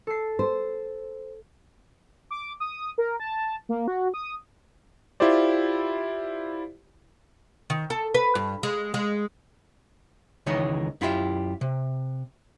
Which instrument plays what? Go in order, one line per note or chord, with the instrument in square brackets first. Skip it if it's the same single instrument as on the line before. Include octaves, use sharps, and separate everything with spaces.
[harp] A4 C7
[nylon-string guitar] C5
[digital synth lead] D6
D#6
A#4
A5
A#3
F#4
D#6
[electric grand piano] E4 F4 G4 C5 D5
[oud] D#3
A4
B4
G2
G#3
G#3
[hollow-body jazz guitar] C#2 D#3 E3 G#3 D#4 C#5
F#2 E4 F4 G4 C#5 E5
C3